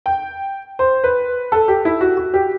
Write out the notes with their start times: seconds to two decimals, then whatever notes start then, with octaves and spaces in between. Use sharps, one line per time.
0.06 G5
0.79 C5
1.04 B4
1.52 A4
1.68 G4
1.85 E4
2.01 F#4
2.17 F#4
2.34 G4